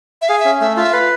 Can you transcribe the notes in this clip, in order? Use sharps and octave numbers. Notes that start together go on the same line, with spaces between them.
E5
G#4 F5
E5
C#4
A3 E5
F4 E5
B4 F5